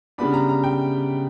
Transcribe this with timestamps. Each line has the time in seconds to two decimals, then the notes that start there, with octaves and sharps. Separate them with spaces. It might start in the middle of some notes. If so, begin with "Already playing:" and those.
0.18 C#3 G3 B3 D4 B5
0.33 A#5
0.49 A#5
0.64 G5